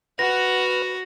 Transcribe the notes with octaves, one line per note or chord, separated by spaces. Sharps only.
F#4 B4 F#5 F6 A#6